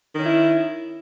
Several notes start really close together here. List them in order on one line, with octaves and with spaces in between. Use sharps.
D#3 C#4 E4